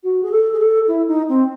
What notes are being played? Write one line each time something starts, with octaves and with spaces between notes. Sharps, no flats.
F#4
G#4
A4
G#4
A4
E4
D#4
C4